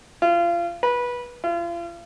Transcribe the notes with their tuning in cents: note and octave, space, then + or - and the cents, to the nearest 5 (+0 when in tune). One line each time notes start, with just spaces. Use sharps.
F4 -30
B4 -20
F4 -40